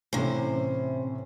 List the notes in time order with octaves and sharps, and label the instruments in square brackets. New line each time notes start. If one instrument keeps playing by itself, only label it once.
[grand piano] A2 E3 C#4 [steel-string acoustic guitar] C3 C5